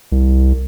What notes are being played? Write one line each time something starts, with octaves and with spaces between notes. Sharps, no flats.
C2